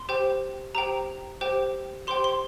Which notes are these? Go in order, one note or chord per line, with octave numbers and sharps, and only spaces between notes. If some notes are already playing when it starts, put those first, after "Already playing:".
Already playing: C6
G4 C5 G5
G4 C5 G5 A#5
G4 C5 G5
G4 C5 G5 C6
C6